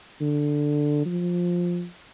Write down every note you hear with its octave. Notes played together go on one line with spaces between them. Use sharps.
D3
F3